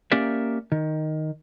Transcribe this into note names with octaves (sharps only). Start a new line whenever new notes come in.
A#3 C#4 G4 A#4 D5 E5
D#3